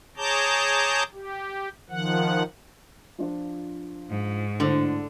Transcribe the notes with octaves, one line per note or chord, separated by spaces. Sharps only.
G#4 C#5 A5 A#5 D6 G6
G4
D#3 F3 F#5
F3 D4 F4
G#2
A2 D3 C5